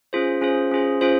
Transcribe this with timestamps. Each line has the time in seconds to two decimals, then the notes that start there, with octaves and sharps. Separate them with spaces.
0.13 C#4 F4 G#4 C5
0.41 C#4 F4 G#4 C5
0.71 C#4 F4 G#4 C5
1.01 C#4 F4 G#4 C5